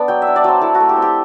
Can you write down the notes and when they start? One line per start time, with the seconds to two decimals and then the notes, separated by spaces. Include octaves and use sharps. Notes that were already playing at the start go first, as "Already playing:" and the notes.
Already playing: B3 D4 D5
0.08 F#3 G5
0.22 E5
0.27 D4
0.36 D5
0.44 F#3 C5
0.61 E4 A4
0.75 F#4
0.80 A3
0.89 G4
0.97 C4
1.02 G4